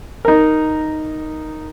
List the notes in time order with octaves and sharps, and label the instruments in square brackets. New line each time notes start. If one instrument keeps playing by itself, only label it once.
[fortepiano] D#4 A#4